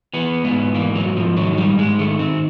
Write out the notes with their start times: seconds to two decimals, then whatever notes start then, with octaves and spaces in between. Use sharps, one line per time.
0.13 E3 B3
0.44 G#2 B3
0.75 E3 A#3
0.95 F#3
1.06 G#2
1.17 F3
1.37 D#3 F#3
1.57 G3
1.68 G#2
1.79 G#3
1.99 D#3 A3
2.19 C4